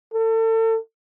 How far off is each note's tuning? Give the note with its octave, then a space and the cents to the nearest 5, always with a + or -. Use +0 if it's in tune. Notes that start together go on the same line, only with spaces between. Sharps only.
A4 +35